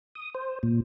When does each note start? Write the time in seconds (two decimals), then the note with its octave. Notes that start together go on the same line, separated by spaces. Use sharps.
0.15 D#6
0.34 C5
0.63 A#2